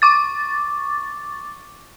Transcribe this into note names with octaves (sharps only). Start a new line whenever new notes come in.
C#6 D6 A6